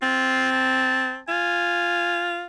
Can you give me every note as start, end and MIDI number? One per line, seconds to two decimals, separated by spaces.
0.02 1.19 60
0.02 0.50 65
0.52 1.19 81
1.29 2.47 65
1.29 2.30 80